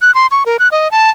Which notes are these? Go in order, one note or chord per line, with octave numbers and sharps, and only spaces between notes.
F#6
C6
C#6
A#4
F#6
D#5
A5